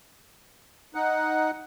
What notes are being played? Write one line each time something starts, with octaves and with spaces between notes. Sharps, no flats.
D#4 F#5